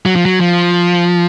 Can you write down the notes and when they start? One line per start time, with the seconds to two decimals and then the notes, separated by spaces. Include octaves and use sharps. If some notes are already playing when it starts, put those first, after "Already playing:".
0.06 F#3
0.16 F3
0.25 F#3
0.41 F3